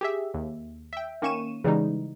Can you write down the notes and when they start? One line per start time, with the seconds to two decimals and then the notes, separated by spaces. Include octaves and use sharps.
0.01 G4 G#4 E5
0.34 D#2
0.93 E5 G5
1.22 D#3 A#3 C#4 C#6 D#7 E7
1.64 C#3 E3 G3 G#3 D#4